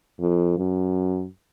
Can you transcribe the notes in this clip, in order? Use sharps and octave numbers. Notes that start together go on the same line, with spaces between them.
F2
F#2